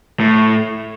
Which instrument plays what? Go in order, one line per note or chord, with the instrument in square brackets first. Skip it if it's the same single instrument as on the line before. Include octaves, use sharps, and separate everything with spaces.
[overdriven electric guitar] A2